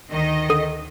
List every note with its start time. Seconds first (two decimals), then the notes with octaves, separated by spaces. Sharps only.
0.10 D2 D#3 D#5
0.50 D3 D#6 D#7